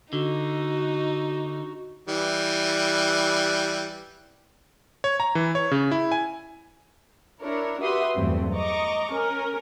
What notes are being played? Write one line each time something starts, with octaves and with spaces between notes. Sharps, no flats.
D3 D#4 F#4
E3 G3
C#5
A#5
E3
C#5
C#3
E4
G#5
D4 E4 A#4 C#5
F#4 G4 B4 E5 C6 D#6
E2 G2 F#3 A3 C4
D#5 A#5 C#6 D6
C#4 A#4